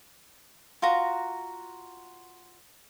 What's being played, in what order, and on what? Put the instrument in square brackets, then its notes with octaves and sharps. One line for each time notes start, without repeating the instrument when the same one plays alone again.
[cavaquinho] F4 F#4 A#5